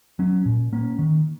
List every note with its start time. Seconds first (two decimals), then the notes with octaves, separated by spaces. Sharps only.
0.19 F#3 C#4
0.46 A#2
0.73 A#3 C#4
0.99 D#3